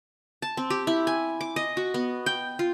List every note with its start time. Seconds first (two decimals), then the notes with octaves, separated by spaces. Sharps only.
0.42 A5
0.57 C4
0.70 G4
0.87 E4
1.07 G#5
1.41 D6
1.56 D#5
1.77 F#4
1.94 B3
2.26 G5
2.59 F4